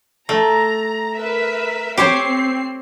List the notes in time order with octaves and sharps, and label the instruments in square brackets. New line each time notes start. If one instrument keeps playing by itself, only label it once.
[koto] A3 [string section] A#5
[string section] A#4 B4 E5
[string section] C4 C7 [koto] G4 C5 C#5